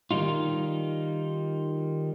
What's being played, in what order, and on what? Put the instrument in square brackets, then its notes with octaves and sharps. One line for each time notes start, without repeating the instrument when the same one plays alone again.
[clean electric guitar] D#3 G3 D#4 F4